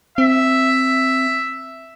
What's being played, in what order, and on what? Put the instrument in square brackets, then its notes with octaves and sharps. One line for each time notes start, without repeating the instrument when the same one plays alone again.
[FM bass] C4 [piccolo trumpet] E5